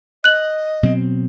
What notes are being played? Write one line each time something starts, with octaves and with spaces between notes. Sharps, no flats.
D#5 F#6 F#7
B2 F#3 C4